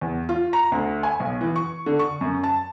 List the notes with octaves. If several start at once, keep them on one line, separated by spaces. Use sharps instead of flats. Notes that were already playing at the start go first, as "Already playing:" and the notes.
E2
F4
A#5
D2
G#5
B1
E3
C#6
D3
C#6
F#2
A5